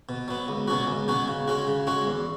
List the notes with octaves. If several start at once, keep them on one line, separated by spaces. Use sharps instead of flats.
B2
F#3 B3
C#2
B2 F#3 C#4 F#4
C#2
B2 F#3 C#4 F#4
C#3
G#3 C#4 F#4
C#3
G#3 C#4 F#4
E2